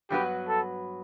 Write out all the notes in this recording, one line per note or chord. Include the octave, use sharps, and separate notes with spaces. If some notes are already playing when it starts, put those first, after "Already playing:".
G2 F#3 B3 F#4 G4 B4
A4